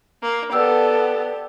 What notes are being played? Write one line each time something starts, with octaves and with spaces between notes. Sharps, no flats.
A#3
B3 G4 A4 D5 E6